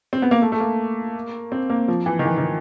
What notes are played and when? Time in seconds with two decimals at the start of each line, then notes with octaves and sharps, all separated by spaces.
0.13 C4
0.22 B3
0.31 A#3
0.42 A3
0.52 A3
0.60 A#3
1.52 C4
1.69 A#3
1.88 F3
2.06 E3
2.19 D#3
2.25 E3
2.38 D#3